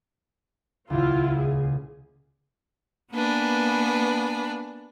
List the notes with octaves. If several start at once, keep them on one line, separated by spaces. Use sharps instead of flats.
D#1 C#2 E4 F4
G#4
A#3 B3 D4 B4 G#5